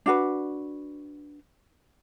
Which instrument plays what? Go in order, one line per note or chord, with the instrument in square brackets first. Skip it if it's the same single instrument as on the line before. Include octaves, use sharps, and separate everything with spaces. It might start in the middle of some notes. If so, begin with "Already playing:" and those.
[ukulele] D4 F#4 B4